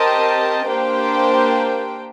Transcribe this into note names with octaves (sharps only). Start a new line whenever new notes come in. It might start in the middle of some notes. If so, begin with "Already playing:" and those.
Already playing: C4 G4 A#4 D#5 A5
A#3 D4 G4 C5 G5